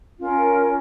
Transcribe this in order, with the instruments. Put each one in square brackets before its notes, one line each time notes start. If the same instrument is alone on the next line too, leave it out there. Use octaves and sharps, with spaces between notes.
[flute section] C#4 F4 A#4